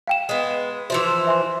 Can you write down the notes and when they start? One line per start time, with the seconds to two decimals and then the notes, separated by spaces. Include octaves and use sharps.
0.07 F5 G5 E7
0.29 G#3 B3
0.90 E3 F3 C5 E5
1.27 E5 G#5 C6